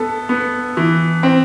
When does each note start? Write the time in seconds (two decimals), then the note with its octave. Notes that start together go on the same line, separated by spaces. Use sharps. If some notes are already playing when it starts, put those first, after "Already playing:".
Already playing: B3 A4
0.29 B3
0.77 E3
1.23 C4